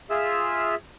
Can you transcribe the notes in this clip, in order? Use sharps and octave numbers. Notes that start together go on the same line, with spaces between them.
F4 G#4 E5 E6 F6